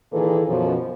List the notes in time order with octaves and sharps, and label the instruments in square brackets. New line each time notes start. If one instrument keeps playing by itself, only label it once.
[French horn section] A#2 D#3 E3 G#4 A4 B4
F#2 B2 F3